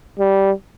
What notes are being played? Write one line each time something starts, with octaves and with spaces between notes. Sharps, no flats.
G3